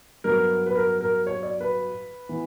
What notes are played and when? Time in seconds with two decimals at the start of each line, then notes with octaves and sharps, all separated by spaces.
0.24 G2 F#3 B3 A#4
0.66 B4
0.75 A#4
1.01 A#4
1.27 C#5
1.43 D5
1.61 B4
2.29 E3 B3